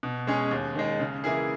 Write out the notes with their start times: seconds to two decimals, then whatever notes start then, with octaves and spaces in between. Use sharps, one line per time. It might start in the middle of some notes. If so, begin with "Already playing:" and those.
0.03 B2
0.27 G#3 C#4 G#4
0.51 D#2
0.75 D#3 G#3
1.00 C#3
1.24 E3 A#3 E4 G#4